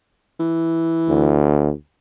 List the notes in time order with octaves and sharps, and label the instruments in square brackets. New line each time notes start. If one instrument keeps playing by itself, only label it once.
[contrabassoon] E3
[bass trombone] D2